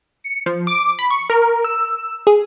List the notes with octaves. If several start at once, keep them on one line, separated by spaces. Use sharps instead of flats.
C#7
F3
D6
B5
C#6
A#4
E6
G#4